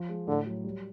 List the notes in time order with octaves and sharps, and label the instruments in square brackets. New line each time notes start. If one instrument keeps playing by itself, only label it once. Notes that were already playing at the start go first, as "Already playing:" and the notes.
Already playing: [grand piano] F3
G#3
[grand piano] A2 [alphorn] D3
[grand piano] F#3
G3